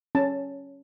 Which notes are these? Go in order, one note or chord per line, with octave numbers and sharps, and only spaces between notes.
C#4 A5